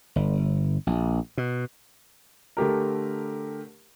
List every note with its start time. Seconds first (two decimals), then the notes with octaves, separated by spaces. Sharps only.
0.16 G1
0.87 A#1
1.37 B2
2.57 D3 A3 G4 A#4